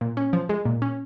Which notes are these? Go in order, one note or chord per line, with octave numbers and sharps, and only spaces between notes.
A#2
C#4
F3
G#3
A#2
C#4